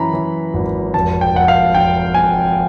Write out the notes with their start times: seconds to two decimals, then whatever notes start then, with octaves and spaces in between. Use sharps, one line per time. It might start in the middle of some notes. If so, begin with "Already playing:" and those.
Already playing: F#2 E3 A#5 B5
0.14 E3
0.54 G#1
0.94 F1 A5
1.21 G5
1.34 F1 F#5
1.48 F5
1.75 F1 G5
2.14 F2 G#5